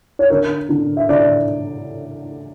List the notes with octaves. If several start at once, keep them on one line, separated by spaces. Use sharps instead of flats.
C#5
D3 A#4
D3
E5
D3 D5